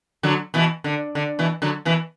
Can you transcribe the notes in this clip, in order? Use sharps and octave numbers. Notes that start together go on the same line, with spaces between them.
D3 F#3
B2 E3
D3
D3
B2 E3
D3 F#3
B2 E3